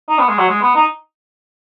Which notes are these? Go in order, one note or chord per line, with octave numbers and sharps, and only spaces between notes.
D#4
B3
G#3
F#3
G#3
B3
D#4